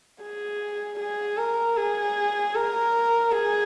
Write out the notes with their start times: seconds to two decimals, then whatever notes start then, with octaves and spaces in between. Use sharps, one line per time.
0.22 G#4
0.99 G#4
1.38 A#4
1.77 G#4
2.55 A#4
3.32 G#4